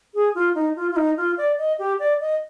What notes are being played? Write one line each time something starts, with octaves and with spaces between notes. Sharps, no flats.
G#4
F4
D#4
F4
F4
D#4
F4
D5
D#5
G4
D5
D#5